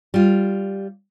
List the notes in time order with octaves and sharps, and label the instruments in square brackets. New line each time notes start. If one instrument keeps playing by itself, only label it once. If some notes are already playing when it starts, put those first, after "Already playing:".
[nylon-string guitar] G3 F4